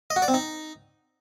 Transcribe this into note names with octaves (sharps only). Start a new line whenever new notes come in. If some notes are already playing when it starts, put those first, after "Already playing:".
D#5
F#4
D5
C4
D#4